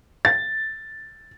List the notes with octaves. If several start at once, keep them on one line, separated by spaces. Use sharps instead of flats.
A6